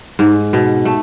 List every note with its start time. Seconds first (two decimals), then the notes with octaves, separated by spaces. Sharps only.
0.19 G#2
0.53 B2
0.85 A3